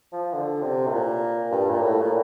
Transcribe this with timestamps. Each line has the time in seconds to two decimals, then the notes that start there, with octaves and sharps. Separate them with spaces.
0.12 F3
0.33 D3
0.62 C3
0.86 A2
0.92 A#2
1.51 G2
1.70 A#2
1.81 A2
2.01 A#2